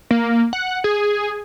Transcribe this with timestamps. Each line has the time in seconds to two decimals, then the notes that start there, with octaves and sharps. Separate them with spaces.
0.11 A#3
0.53 F#5
0.84 G#4